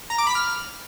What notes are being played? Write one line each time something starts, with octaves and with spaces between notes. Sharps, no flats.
A#5
D6
B5
F6